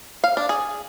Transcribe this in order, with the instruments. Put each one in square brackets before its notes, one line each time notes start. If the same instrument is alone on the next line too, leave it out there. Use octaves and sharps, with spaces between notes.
[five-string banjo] F5
D4
G#4